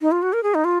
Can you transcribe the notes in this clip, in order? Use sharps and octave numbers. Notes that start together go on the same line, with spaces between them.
D#4
F4
F#4
A#4
G#4
D#4
F4